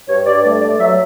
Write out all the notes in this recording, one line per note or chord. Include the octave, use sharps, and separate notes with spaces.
G2 C#5
G2 D5
A3 D5
A3 D5
F#3 E5